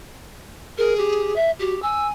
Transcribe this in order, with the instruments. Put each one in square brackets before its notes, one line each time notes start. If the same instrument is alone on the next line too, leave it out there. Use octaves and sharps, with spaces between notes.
[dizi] G#4 [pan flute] A#4
[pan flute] G4
E5
[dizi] F#4 [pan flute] G4
[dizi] G#5 [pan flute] E6